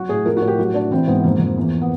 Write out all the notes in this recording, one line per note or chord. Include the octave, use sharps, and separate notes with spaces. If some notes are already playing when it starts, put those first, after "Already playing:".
Already playing: F#3 F#4
A2 G#4
F3 A#4
F#4
A2
G4
F#3 F#4
A2 D4
E3 C4
G#2 B3
F2 A#3
F2
E2
B3